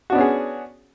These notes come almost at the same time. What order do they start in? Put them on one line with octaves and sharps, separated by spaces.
F#4 D4 B3 C#4 G#4